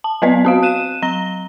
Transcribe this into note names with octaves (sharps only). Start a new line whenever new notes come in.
A5
F#3 B3 B4 D5 D#5
C4 F#4 F5
F#6 D#7 E7
F#3 A#5 A#6 G7